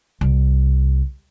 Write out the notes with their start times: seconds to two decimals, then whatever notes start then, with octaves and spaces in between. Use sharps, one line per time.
0.21 C2